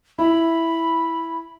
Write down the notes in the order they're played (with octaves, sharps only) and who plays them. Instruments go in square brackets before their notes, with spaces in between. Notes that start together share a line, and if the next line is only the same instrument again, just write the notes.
[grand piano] E4 [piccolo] B5